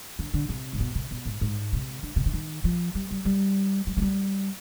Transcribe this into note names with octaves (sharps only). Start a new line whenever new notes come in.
D3
D3
C3
G#2
B2
C3
B2
G#2
G#2
C3
D3
C3
D3
D#3
F3
G3
G3
G3
G3
G#3
G3